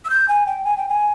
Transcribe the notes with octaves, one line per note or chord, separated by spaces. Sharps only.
E6
G6
G#5
G5
G#5
G5
G#5